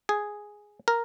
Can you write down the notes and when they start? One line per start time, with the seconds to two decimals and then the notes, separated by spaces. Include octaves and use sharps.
0.09 G#4
0.88 A#4